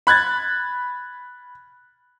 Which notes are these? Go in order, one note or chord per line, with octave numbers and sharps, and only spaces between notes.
B5 F#6 G#6 A6